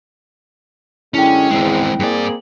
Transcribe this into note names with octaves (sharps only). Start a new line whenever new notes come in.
F#2 D3 G#3 C#4 E4 G5
E2 G#2 G#3 C4
G2 A#3 C4 G#4 D5